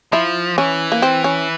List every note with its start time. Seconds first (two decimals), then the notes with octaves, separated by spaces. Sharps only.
0.12 F3 E4
0.58 E3 C#4
0.92 A#3
1.02 C4
1.24 C#4